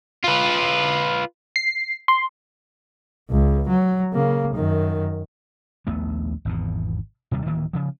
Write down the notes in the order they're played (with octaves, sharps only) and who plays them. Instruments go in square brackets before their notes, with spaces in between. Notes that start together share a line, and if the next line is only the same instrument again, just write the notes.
[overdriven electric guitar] F4 B4
[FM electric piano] C7
C6
[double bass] C#2
F#3
C#3 A#3
F#2 D#3
[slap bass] A#1 D#2 A3 B3
G#1 E2 B2
D#2 C3 G3
D1 D#3 E3 A#3
C#3 F3